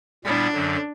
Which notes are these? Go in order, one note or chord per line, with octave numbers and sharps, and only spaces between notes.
A#2 G3 B3 D4 E4
F#2 D3 F#3